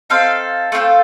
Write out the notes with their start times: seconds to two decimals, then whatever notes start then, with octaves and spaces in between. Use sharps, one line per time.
0.10 C4 D#4 A4 F5
0.72 A3 C4 F4 A4